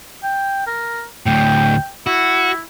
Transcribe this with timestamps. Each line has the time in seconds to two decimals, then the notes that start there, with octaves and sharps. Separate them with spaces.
0.23 G5
0.67 A#4
1.26 D2 A2 G5
2.07 E4 F#4